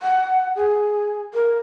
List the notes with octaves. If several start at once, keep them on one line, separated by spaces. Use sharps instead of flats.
F#5
G#4
A#4